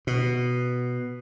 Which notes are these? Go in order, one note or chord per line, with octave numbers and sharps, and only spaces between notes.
B2